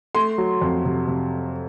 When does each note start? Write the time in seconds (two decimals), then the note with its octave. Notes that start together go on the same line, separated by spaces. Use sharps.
0.15 A3 C6
0.38 F#3
0.61 F2
0.85 C3
1.07 C3